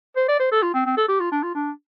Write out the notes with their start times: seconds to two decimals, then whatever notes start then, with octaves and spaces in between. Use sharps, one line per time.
0.16 C5
0.28 D5
0.40 C5
0.51 A4
0.63 F4
0.74 C4
0.86 C4
0.97 A4
1.09 G4
1.20 F4
1.32 D4
1.43 F4
1.55 D4